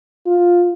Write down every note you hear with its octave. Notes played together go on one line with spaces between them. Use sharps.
F4